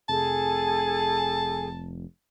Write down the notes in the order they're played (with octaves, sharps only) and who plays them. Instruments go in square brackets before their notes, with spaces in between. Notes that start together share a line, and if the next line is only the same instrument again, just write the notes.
[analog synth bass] F1 [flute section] G#4 A4 G#5 [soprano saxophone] A5